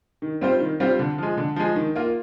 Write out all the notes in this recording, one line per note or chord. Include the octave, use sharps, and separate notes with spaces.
D#3
G3 C4 F4 C5
D#3
G3 C4 F4 C5
D3
F3 G#3
D3
F3 G#3
D#3
A#3 F4